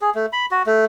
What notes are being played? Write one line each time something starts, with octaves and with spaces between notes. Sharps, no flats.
G#4
A3
B5
F#4
A3